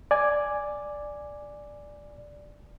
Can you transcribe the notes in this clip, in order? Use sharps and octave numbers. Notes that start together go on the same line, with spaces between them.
D5 G#5